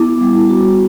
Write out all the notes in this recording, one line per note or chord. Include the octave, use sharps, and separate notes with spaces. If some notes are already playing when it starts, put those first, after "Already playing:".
Already playing: B3 E4 D6
G3
F#4